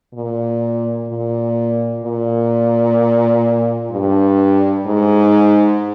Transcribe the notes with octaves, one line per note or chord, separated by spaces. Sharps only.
A#2
A#2
A#2
G2
G#2